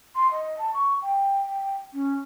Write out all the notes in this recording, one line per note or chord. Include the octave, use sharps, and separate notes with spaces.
C6
D#5
A5
C#6
G5
G5
C#4